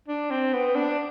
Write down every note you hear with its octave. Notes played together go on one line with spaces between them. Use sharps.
D4
C4
B3
D4